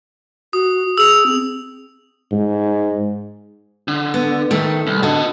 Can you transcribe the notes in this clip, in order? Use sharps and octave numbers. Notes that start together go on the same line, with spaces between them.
F#4 D#6
G#4 E6 F7
C4
G#2
D3
B3
D#3 A3
C2
D3 F#4 D#5